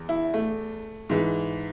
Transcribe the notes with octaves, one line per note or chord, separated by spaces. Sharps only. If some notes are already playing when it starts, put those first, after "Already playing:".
Already playing: E2
E4
A3
G#2 E3